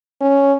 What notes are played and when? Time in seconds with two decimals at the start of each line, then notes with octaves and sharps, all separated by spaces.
0.21 C#4